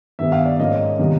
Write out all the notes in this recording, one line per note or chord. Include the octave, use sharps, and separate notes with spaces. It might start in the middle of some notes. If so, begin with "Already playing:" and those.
G2 D#3 G3 B3 E5
F5
D5
G#2 F3 A#3 C#4 D#5
C3 D#3 G3 B3